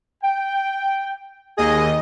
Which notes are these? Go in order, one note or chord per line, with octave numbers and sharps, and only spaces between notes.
G5
D#2 G#4 D#5